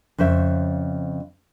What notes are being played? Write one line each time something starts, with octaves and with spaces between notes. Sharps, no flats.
F2 C#3 C5 E5